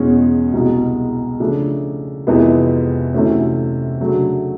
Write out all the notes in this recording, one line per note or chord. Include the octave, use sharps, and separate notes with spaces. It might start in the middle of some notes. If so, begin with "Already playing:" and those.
Already playing: E2 B2 G#3 C#4
C2 B2 G#3
C#3 F3 A3 D4
F2 C3 E3 G#3 B3
D2 C3 E3 A3 C#4
C#3 F#3 A3 D4